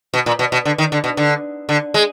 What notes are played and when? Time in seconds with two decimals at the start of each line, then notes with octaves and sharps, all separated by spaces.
0.14 B2
0.26 A#2
0.39 B2
0.52 B2
0.65 D3
0.78 D#3
0.92 D3
1.04 B2
1.17 D3
1.69 D3
1.94 G#3